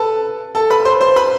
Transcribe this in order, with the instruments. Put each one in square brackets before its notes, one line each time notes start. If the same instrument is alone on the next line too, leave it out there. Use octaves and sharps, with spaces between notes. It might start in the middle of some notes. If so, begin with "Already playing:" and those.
Already playing: [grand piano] A4 B4 A5
A4 A5
B4 B5
C5 C6
C5 C6
B4 B5